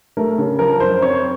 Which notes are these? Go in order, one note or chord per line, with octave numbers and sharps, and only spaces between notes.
A3 A#4
C#3
F3 A#4
F#2 C5
C4 C#5